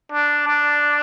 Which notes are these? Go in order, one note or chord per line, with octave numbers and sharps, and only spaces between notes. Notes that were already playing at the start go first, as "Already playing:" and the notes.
D4
D4